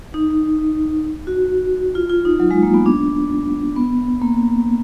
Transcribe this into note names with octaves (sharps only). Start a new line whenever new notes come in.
D#4
F#4
F4
F4
D#4
F#3
G#3
A#3
B3
D4
B3
A#3